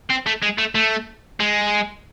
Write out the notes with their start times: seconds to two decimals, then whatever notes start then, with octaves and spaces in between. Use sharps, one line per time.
0.10 C4
0.26 A3
0.43 G#3
0.58 A3
0.75 A3
1.40 G#3